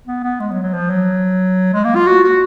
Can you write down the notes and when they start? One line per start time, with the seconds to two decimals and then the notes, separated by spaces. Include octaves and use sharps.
0.07 B3
0.24 B3
0.40 G#3
0.51 F#3
0.63 F#3
0.73 F3
0.90 F#3
1.73 G#3
1.84 A#3
1.95 F4
2.07 F#4
2.24 F#4